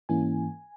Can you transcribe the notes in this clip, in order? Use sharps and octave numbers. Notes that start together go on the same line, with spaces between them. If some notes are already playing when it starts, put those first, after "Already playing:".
G#2 E3 A#3 C#4 E4 G#5